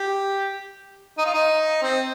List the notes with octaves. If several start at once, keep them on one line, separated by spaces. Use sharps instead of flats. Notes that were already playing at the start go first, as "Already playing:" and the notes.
Already playing: G4
D#4
F4
D#4
C4